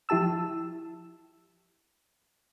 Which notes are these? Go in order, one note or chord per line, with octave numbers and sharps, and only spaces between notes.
F3 E4 G4 A5 E6